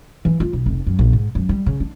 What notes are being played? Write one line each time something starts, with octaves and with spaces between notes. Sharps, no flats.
E3
F4
B1
F1
F#2
A#1
G#2
F#2
G3
C#3
D4